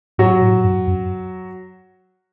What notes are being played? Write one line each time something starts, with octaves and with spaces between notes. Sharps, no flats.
G#2 F#3 F#4
A2
G2
F#2